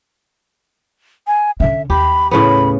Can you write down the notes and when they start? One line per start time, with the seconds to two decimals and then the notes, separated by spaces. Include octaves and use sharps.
1.27 G#5
1.60 D3 C#4 E5
1.90 D#2 G4 B5
2.31 A2 C#3 B3 B5